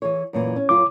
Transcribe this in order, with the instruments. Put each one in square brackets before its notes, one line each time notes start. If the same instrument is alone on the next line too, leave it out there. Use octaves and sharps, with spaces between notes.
[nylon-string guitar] E3 G#4 C#5
F#2 A#2 E3
C#4
[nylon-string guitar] F#2 F4 [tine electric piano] D6